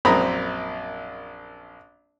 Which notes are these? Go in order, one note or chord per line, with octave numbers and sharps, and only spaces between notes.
A#1 F#2 C4 A#5 B5 D#6